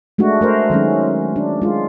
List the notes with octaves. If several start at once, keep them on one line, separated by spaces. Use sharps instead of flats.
G#3 A3 D4 F#4
A3 A#4 C5
D#3 F#3 G#3 C#4
D4
G#3 F4